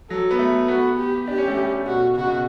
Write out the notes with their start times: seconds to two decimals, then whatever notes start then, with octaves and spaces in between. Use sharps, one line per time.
0.10 F#3 A4
0.31 B3
0.39 A3
0.68 B3 F#4
0.98 G4
1.28 D4 G4
1.38 C#4
1.48 A3
1.57 G3
1.87 B2 F#4
2.16 C#3 F#4
2.27 B2